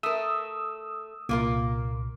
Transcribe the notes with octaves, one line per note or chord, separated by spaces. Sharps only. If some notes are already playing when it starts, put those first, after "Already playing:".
A3 A#4 D#6 E6
C2 A#2 A#3 F4 A#4